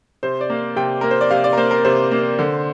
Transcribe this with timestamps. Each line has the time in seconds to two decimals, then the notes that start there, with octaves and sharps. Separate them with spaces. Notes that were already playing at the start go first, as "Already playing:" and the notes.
0.23 C3 C5
0.41 D5
0.50 A#3
0.76 C3 G5
1.01 A#3 A#4
1.11 C5
1.21 D5
1.31 C3 F5
1.44 D5
1.53 A#4
1.57 A#3 C5
1.71 A#4
1.85 C3 C5
2.12 A#3
2.39 D3